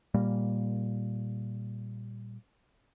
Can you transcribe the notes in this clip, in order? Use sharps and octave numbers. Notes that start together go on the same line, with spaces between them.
A#2 G3 A#3